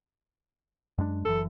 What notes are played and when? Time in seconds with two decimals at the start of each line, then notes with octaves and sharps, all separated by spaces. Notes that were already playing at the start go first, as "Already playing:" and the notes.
0.98 F#2 G#3 D4
1.25 F#1 F#2 E3 A4